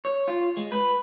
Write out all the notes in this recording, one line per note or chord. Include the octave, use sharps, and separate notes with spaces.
C#5
F4
G#3
B4